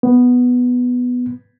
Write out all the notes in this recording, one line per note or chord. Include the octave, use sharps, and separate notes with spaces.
B3